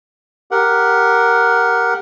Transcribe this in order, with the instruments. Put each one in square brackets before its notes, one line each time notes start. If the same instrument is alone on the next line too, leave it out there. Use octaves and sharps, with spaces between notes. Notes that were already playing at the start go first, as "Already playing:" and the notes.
[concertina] G4 A#4 F#5